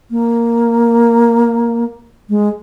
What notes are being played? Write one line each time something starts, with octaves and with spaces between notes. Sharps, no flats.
A#3
G#3